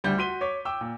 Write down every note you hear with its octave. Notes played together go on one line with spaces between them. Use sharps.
D2 G3 G6
F#4 C6 B6 D#7 G7
C#5 C#6 D6 B6
G5 D6 E6
A#2